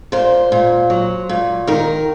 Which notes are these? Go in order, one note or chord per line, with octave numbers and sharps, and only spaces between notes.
A#2 C5
A#2
F#3
A#2
D#3 A#4